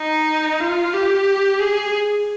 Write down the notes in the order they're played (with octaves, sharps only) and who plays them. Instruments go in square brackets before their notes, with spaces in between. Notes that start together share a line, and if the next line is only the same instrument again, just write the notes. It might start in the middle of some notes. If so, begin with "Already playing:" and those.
Already playing: [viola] D#4
F4
G4
G#4